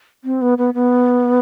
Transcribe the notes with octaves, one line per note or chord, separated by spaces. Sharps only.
C4
B3
B3
B3